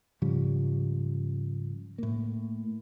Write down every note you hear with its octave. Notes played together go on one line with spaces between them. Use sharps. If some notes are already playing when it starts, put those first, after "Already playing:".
G#2 C#3 F3 G3
A2 A#3